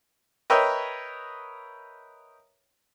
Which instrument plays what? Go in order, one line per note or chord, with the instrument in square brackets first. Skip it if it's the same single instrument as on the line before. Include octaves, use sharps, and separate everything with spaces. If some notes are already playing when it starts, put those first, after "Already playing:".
[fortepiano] A#4 B4 C#5 D#5 E5 G5